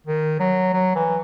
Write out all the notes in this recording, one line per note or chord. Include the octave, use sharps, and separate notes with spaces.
D#3
F#3
F#3
E3